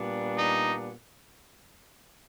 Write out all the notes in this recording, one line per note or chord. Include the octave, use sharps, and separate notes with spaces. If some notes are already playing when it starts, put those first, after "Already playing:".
Already playing: A#2 G3 B3 D4
D#4